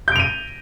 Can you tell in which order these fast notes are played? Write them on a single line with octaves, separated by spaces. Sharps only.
G6 D7 F7 D#7